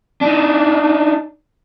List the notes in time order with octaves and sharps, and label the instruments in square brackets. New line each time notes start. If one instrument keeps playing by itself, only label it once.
[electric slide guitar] D4 D#4